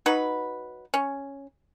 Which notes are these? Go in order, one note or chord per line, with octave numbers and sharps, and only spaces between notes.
F#3 D#4 F#4 B4
C#4